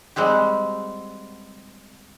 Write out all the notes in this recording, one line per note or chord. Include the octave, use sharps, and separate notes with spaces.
G3 G#3 C4 F#4 G4